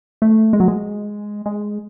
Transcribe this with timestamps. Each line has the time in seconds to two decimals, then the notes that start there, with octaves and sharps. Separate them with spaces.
0.22 A3
0.53 G#3
0.60 F#3
0.68 G#3
1.46 G#3